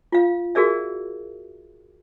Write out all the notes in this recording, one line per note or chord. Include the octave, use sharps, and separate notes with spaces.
F4 F5
F#4 G#4 A#4 D5 E5